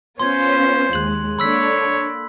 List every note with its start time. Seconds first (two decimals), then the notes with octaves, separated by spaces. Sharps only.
0.20 B3 C#4 F4 C5 C6 G#6
0.93 D#2 G#3 F#6 F#7
1.39 A#3 D4 A4 C#5 B5 E6 B6